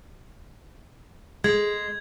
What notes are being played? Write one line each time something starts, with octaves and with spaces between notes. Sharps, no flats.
G#3 G#6